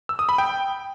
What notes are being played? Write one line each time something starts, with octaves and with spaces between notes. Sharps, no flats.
E6
D#6
B5
G5